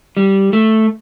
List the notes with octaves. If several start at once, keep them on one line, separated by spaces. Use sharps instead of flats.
G3
A3